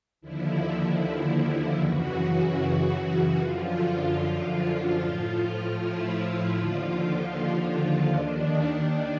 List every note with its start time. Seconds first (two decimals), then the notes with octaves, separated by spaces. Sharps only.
0.21 D#2 D3 F3 E4
1.79 F#2 C#3 E3 F#4
3.37 F#2 D3 F3 F4
4.16 F4
4.95 A2 F3
5.75 E4
6.54 D#2 D3 F3 F4
7.33 F4
8.12 D#2 D#3 D4